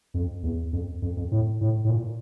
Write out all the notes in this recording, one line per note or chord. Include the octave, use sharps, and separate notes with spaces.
F2
E2
F2
F2
F2
A2
A2
A2
A#2